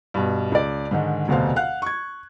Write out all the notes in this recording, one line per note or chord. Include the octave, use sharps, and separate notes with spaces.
G2 B2
C#2 D5
G#2 D3 D#3 G#3
F1 D2 B2 D3 C5 F5
F5 F#5 F#6
C#6 G#6